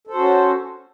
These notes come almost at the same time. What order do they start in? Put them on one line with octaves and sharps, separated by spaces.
A4 C5 F#4 C#4